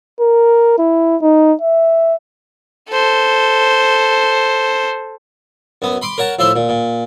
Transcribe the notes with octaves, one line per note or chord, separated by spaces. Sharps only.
A#4
E4
D#4
E5
A4 C5
F#2 B3
B5 C6 D6
A#4 C#5 F#5 A5
A2 F3 E5 C6
A#2
A#2